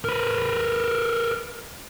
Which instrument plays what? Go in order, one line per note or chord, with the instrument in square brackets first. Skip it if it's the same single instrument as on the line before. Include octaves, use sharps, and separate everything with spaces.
[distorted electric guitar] A#4 B4